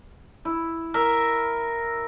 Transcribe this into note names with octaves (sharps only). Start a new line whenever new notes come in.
E4
A#4 E5